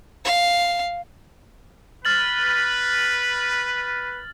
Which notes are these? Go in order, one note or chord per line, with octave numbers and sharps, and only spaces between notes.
F5
B4 F6 A6 F#7